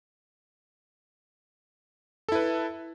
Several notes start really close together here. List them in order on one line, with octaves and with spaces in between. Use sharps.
A4 E4 B4